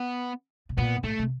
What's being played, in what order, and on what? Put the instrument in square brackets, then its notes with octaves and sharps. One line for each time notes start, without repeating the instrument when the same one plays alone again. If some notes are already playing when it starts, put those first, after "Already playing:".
Already playing: [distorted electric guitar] B3
[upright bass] B2
[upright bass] A#2 [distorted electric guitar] B3
[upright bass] A2 [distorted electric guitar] A3
[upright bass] C3